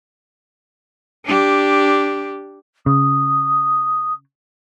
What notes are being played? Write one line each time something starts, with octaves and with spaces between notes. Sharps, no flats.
D4 G4
C#3 D#6